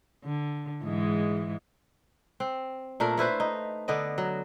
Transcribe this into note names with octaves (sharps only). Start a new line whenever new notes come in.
D3
G#2 E3 G#3
C4
A#2 A3 D4 A#4
A3 E4 B4 C5
D#4
D3 B3 D5 D#5
F#3